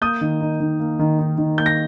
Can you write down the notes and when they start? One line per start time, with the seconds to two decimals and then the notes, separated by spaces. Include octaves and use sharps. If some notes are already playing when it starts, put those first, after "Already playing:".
0.01 A#3 D#6 G6
0.21 D#3
0.41 D#4
0.60 D#3
0.80 A#3
0.99 D#3
1.19 D#4
1.38 D#3
1.58 A#3 G6
1.66 A#6